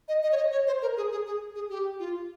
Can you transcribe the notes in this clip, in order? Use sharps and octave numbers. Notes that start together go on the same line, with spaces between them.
D#5
D#5
C#5
D#5
C#5
C5
A#4
G#4
G#4
G#4
G#4
G4
F4